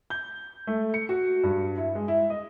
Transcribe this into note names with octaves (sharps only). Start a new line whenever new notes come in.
G6
A3
C#7
F#4
G2
E4
G#3
E4
D#5